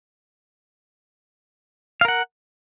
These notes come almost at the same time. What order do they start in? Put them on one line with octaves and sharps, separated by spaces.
F5 A#4 F#5